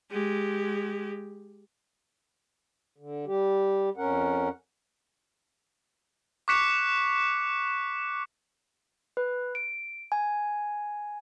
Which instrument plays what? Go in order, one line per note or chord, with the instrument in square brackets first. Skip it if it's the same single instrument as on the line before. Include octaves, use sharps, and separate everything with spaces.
[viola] G#3 G4
[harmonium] D3
G3 G4
F2 C#4 A#4 F#5
[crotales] C#6 D6 F#6 B6 C#7 E7
[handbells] B4
D7
G#5